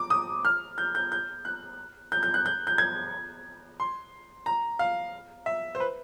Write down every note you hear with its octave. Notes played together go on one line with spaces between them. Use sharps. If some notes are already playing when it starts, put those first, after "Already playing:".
Already playing: D6
D#6
F6
G6
G6
G6
F#6
G6
G6
F#6
G6
G6
G#6
C6
A#5
F5
E5
C5
B4